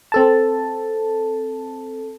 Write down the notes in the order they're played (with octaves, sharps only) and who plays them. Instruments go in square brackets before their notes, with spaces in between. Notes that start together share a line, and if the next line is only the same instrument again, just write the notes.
[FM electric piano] C4 A4 A5